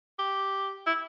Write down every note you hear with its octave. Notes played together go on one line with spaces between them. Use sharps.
G4
E4